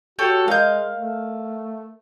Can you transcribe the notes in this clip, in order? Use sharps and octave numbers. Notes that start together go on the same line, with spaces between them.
F#4 G4 A4 C#5
G#3 A#4 D#5 F5 G6
A3